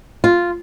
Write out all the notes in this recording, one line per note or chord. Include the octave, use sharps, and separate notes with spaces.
F4